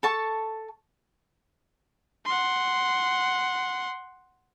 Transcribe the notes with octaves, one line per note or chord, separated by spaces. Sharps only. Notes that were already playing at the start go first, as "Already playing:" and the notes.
A4 A5 C#6
F#5 C6